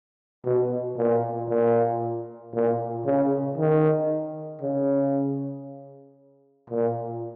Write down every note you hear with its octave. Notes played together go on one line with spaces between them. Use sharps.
B2
A#2
A#2
A#2
C#3
D#3
C#3
A#2